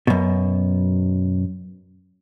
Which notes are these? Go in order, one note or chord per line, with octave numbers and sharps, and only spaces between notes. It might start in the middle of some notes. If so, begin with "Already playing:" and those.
F#2 B2